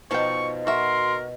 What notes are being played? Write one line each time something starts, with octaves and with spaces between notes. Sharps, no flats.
B2 F3 D#4 G5 A5 C#6
F#4 A#4 E5 C6